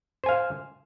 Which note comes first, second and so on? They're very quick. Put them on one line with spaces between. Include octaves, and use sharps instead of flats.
C5 G#5 F5